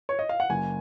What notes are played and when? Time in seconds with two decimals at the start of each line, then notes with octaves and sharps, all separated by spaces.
0.09 C#5
0.19 D#5
0.29 F5
0.40 F#5
0.50 F#1 G#5